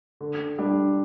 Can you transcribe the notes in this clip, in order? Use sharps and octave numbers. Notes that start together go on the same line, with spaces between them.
D3
G3 D4